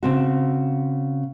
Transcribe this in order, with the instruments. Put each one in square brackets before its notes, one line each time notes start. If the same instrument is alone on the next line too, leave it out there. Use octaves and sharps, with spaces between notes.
[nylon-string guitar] C#3 C4 F#4